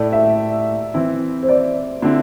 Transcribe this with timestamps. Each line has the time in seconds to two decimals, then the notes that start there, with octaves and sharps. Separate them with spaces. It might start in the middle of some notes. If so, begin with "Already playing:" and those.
Already playing: A2 A3 E4 D5
0.13 E5
0.94 E3 C4 E4
1.43 C5
1.49 D5
2.02 D3 C4 E4